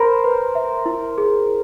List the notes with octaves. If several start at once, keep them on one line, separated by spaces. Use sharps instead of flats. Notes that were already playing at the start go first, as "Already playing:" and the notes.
Already playing: A#4 C5 B5
B4
E5
E4
G#4